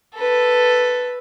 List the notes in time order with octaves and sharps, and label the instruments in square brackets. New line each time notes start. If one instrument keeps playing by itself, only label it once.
[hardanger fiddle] A4 B4